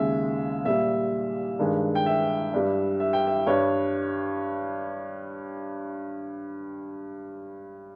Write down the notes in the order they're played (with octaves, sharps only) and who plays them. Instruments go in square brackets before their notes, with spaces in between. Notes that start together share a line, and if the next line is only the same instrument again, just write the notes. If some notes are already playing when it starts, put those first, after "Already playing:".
Already playing: [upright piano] D#2 C#3 G#3 E5
A#2 G3 E5
G2 D#3 G#3
G5
E5
G2 G3
E5
G5
E5
G2 G3 C#5